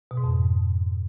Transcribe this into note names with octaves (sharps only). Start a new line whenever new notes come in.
B2
G#2
F2